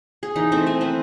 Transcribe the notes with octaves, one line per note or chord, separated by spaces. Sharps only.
G#4
E3 D#4
A3 C4 E5
A3 G#5
C4 B4